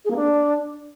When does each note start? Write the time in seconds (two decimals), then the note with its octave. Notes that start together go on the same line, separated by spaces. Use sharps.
0.05 G#4
0.11 A#3
0.16 D4